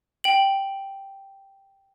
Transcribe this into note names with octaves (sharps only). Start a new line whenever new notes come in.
G5 F#7